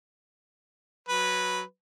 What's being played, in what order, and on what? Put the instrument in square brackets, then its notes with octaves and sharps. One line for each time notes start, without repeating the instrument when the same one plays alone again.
[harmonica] F#3 B4